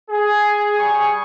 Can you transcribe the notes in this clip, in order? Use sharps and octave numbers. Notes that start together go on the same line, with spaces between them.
G#4
G3 G#5 C#6 D#6